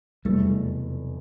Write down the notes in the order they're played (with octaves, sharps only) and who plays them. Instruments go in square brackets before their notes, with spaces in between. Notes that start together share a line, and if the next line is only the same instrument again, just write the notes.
[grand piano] F1 E2 B2 F#3 [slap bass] G3 A3